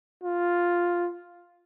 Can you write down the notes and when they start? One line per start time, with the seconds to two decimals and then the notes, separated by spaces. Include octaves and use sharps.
0.24 F4